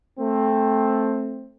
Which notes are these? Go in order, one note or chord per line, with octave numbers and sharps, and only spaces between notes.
A3 C4